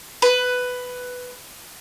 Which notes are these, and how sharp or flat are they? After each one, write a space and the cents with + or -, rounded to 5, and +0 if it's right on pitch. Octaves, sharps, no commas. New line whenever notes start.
B4 +10